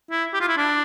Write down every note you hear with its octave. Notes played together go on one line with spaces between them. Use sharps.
E4
G4
F4
E4
D4